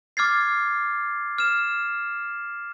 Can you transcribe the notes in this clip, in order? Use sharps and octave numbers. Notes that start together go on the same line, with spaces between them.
D6 F6 G#6 A6 C7
F6 E7